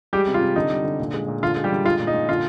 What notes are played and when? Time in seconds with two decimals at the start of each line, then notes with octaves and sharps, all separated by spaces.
0.13 G3 G#3 G4
0.27 C3
0.34 F4
0.41 C3
0.56 D3 D#4
0.70 G3
0.84 D3
1.00 A#2
1.14 G#3
1.28 A#2
1.43 D3 F4
1.57 G#3
1.64 G3 G4
1.71 D3
1.85 G#3 F4
2.00 A#2
2.07 D#4
2.14 A#2
2.29 D3 F4